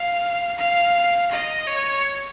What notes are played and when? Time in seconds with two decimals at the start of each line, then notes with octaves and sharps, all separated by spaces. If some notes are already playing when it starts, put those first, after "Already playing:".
Already playing: F5
0.58 F5
1.32 D#5
1.67 C#5